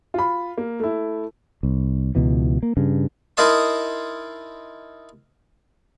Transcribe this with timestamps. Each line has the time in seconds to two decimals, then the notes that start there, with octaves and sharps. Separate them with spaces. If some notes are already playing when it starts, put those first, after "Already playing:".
0.14 F4 B5
0.58 A#3
0.80 A3 E4
1.63 C2
2.15 C#2 B2 E3
2.63 A#3
2.77 G2 C#3
3.37 D#4 E4 A#4 D#5 A5 C6